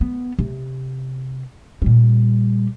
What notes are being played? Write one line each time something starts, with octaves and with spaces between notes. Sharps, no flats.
B3
C3
A#2 G3